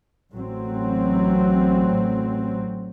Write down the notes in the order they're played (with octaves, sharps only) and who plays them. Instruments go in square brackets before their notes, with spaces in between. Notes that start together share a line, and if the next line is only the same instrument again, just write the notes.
[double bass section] A1 F#3 C4